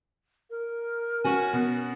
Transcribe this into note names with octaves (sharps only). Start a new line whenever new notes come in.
A#4
C#4 F#4 G#5
B2